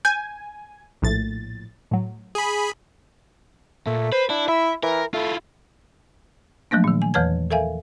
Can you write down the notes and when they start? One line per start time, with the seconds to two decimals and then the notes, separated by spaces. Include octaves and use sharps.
0.05 G#5 G6
1.02 A#1 A2 A6
1.91 A2 F#3
2.35 G#4 B5
3.87 A#2 A3
4.12 B4 C5
4.30 D4 E4
4.48 E4 E5
4.83 E3 A#4
5.14 A3 E4 F4
6.71 F3 F#3 A3 A#3 D4
6.84 A#2 D#3
7.02 G#5
7.14 E2 E3 B4 C#5 A5 G#6
7.51 A4 A#4 E5 F5 G#5